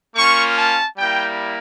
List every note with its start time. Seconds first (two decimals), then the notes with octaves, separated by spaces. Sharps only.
0.16 A#3 C#4 F4 C#6
0.58 A5
0.98 G3 A#3 E4 G5